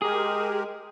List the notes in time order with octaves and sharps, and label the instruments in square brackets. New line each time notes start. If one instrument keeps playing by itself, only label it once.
[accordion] G#3 G4 A#4 [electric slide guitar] G#4